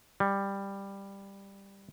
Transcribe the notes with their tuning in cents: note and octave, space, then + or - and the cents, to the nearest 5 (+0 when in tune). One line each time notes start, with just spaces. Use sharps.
G3 +10